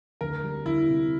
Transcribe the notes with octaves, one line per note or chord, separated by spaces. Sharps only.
D2 A#4
G3
D2 E4
C3